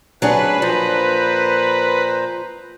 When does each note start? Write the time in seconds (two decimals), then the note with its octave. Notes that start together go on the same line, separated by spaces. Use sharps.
0.22 D2 C3 F#3 D4 G#4 B4 F#6
0.62 A#2 F3 C5 A#5